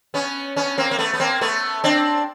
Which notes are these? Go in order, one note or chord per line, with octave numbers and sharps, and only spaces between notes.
B3 C#4
B3 C#4
A#3 C4
A#3
A3 B3
B3
A#3 C4
A3 B3
C4 D4